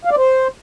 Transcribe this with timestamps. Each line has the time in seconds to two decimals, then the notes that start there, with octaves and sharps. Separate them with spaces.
0.05 F5
0.11 D5
0.17 C5